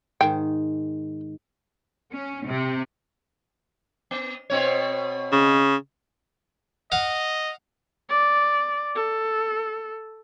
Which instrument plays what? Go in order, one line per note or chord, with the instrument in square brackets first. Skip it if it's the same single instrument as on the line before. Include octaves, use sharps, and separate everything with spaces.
[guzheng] G#2 D#3 [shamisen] G5
[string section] C#4
C3
[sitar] B3
B2 C4 C#5
[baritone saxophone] C#3
[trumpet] D#5 [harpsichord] F5 F#5
[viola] D5
A4